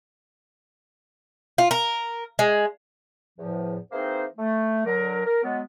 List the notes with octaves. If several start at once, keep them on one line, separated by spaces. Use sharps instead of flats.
F4
A#4
G#3
E2 A2 F3
E3 A#3 C4 D#4 G#4 C5
A3
D3 F#3 A#4
A#4
F#3 G#3 B3